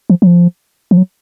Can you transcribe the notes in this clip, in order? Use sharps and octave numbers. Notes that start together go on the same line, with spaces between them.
F3
F#3
F3
F3
F#3